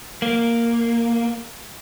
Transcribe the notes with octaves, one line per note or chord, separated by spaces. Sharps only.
A#3